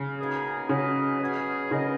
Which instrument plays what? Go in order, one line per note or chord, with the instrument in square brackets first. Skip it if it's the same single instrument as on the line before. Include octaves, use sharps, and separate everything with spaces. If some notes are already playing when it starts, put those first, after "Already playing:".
Already playing: [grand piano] C#3
[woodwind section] B2 A#3 D#4 G#4
[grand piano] C#3 [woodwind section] F#3 C#4 G#4 B4 D#5
[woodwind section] B2 F#3 C#4 G#4
[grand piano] C#3 [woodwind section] B3 D#4 A#4 D#5